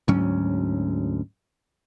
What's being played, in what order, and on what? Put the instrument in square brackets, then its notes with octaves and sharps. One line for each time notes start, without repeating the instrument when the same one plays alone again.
[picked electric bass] D2 G#2 F#3 C#4